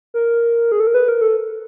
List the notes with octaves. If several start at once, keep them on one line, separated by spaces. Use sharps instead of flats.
A#4
G#4
A4
A#4
B4
A#4
A4